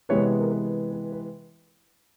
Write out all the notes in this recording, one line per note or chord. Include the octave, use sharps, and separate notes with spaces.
C3 E3 G#3 B3 B4 C#5
A#4
B4
B4
B4